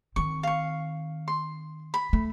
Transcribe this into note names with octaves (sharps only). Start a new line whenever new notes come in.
D#3 C4 C#6
F5 C#6
C6
B5
A3